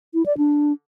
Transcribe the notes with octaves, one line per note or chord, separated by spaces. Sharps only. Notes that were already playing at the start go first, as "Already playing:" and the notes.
E4
D5
D4